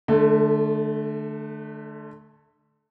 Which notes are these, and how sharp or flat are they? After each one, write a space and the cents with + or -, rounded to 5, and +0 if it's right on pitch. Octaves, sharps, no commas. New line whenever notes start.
D3 +20 A3 -20